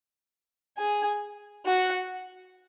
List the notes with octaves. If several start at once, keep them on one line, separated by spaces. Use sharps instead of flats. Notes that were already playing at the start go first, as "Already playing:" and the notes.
G#4 G#5
F#4 F#5